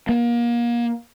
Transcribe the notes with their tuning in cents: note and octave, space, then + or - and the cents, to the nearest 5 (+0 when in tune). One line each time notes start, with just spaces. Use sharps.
A#3 +30